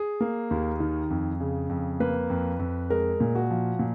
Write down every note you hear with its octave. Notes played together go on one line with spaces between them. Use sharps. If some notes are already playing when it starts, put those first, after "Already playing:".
Already playing: G#4
A#3
D#2
D#3
F2
C#3
F2
A#3 B4
F2
F2
G#3 A#4
A#2
F#4
F3
A#2